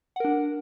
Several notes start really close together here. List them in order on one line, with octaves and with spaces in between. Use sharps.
F#5 A#4 D4